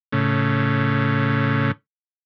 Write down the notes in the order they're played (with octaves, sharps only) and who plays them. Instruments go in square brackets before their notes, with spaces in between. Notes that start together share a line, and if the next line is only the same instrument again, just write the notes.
[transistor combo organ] A2 C#3